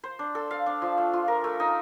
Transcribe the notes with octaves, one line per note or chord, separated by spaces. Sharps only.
C5
D4
A4
F5
D4
F3
A3
F4
A#4
A3
D#4